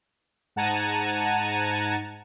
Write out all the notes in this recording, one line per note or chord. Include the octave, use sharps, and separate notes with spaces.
G#2 F#5 A5 A#5 G#6 D#7